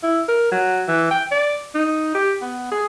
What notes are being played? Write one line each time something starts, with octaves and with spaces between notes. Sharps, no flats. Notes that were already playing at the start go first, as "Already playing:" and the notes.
E4
A#4
F#3
E3
G5
D5
D#4
G4
B3
G#4